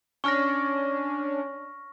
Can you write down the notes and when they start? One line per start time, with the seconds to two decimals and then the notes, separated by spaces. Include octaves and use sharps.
0.24 C#4 D4 C#6 F6 A#6